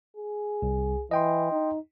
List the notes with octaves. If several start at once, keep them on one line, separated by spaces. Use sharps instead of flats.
G#4
C2
E3 D#5 G5 C6
D#4